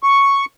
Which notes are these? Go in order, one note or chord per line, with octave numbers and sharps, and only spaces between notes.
C#6